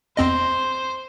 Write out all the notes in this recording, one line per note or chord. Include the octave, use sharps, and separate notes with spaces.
E2 C4 C5 D#5